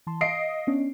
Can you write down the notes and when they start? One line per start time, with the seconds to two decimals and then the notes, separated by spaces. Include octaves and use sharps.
0.07 E3 A5 C6
0.21 D#5 F5 C7 D7
0.67 B3 C#4 D4